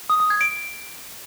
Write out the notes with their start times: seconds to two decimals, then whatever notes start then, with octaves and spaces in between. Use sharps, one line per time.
0.10 D#6
0.20 D#6
0.30 G#6
0.41 D7